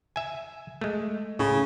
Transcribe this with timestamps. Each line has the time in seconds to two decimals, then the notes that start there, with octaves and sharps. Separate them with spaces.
0.16 E5 G#5
0.81 G#3 A3
1.39 A2 C#3